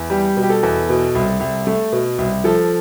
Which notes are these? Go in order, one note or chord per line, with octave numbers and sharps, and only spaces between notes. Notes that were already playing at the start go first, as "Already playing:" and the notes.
Already playing: E2
G3 G4
B2
G4
A4
E2
B2
C2
C2
A3
B2
C2
F3 A4